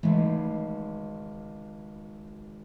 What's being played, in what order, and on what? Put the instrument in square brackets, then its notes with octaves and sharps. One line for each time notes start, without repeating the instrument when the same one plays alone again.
[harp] G#1 C#2 [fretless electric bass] E3 G#3 A3